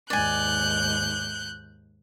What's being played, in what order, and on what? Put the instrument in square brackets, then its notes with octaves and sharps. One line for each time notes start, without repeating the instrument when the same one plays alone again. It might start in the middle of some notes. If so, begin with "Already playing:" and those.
[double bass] D#2 G#2 [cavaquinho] D5 G#5 [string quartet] F#6 G6